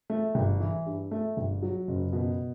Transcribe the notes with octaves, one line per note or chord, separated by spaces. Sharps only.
A3
G1
E3
G2
A3
G1
F#3
F#1
B2